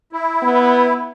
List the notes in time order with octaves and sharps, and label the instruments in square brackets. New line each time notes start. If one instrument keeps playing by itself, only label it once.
[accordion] E4
[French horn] B3